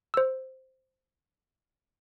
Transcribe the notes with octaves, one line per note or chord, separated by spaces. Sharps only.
C5 E6